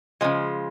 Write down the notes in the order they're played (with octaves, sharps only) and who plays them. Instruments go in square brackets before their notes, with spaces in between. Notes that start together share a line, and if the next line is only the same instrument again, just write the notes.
[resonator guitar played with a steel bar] C#3 F3 G#3